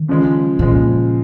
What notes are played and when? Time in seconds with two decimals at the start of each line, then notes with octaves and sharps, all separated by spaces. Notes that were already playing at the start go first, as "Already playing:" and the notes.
Already playing: D#3
0.08 C#3 F3 G#3
0.59 A#2 C#3 F3 G#3